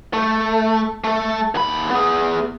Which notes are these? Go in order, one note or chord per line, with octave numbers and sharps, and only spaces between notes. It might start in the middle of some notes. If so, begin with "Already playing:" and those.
A3
A3 A4
D#2 B5
B3 G#4